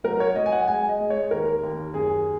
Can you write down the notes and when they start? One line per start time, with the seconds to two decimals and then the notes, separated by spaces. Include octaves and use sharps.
0.04 F#3 A#4
0.20 C#5
0.35 F#3 D#5
0.46 G#5
0.52 F#5
0.68 G#3 G#5
0.89 D#5
1.00 G#3
1.10 C#5
1.31 D#2 A#4
1.63 D#2
1.94 F#2 G#4